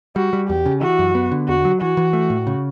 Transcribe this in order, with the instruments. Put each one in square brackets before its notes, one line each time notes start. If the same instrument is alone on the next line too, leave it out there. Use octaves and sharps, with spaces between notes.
[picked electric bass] G3 [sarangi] F#4
[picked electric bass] G3
[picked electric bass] E2 [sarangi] G4
[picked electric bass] C#3
[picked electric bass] E3 [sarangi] F#4
[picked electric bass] F#2
B3
D3
[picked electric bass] E2 [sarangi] F#4
[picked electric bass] F#3
[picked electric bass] E3 [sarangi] F#4
[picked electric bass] E3
A3
A2
C#3